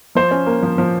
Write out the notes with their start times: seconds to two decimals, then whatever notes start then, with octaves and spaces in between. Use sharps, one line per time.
0.15 F3 C5
0.31 C#4
0.46 A#3
0.63 F3
0.78 F3